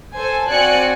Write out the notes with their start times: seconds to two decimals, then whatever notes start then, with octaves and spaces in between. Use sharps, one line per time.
0.14 A4 C5 G#5
0.49 C4 F#4 D5 G#5 F#6 C#7